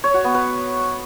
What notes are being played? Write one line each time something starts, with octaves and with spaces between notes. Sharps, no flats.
C#5
F#4
B3
B4